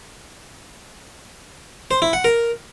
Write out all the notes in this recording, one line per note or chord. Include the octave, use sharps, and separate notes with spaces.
C5
E4
F#5
A#4